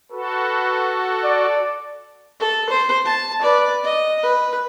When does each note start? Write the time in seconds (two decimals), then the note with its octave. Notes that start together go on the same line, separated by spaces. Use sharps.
0.12 F#4 A4 B4
1.24 D5
2.40 A4
2.70 C5
3.05 A5
3.42 B4 D5
3.84 D#5
4.23 B4